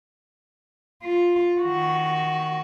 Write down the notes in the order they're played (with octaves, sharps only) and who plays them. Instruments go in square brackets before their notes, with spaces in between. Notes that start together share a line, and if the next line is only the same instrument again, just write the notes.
[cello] F4
D#3 F#4